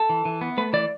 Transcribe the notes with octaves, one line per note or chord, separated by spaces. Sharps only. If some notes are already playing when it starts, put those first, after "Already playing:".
Already playing: A4
E3
E3
B3
A3 B4
E3 D5